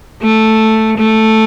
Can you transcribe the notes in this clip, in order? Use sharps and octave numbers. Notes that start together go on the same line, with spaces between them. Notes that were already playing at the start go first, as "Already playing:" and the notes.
A3
A3